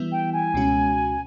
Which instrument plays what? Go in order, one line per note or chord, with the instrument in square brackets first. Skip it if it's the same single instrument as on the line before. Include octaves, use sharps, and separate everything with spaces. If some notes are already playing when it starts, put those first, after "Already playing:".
Already playing: [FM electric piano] E3 G3 B3 E4
[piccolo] G5
G#5
[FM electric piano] C#2 B2 G#3 C#4 F#4